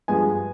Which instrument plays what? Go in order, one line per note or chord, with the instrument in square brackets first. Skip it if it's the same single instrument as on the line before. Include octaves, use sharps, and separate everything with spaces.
[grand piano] G2 F3 G#3 B3 G#5